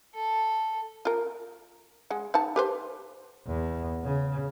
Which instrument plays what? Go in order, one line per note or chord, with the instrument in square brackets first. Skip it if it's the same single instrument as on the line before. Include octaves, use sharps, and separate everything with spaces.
[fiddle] A4
[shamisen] F4 A#4
G#3 F#5
D#4 F#5 A5
G4 B4 C5
[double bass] E2
C#3